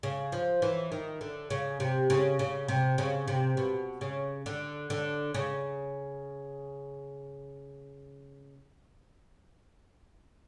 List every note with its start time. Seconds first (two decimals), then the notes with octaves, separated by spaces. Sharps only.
0.03 C#3
0.32 F3
0.62 E3
0.92 D#3
1.21 D3
1.50 C#3
1.80 C3
2.10 C#3
2.39 C#3
2.68 C3
2.98 C#3
3.28 C3
3.57 B2
4.01 C#3
4.46 D3
4.90 D3
5.34 C#3